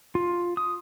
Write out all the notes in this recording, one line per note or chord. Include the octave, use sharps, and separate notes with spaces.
F4
D#6